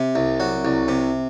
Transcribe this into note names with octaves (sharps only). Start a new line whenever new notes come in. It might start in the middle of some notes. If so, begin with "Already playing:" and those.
Already playing: C3
C2
F#3
C2
C3